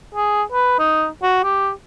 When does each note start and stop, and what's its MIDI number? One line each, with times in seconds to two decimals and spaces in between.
0.15 0.43 68
0.52 0.78 71
0.79 1.07 63
1.23 1.40 66
1.44 1.70 67